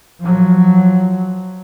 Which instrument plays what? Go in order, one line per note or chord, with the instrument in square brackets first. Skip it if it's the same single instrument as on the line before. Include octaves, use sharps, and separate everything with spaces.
[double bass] F3 F#3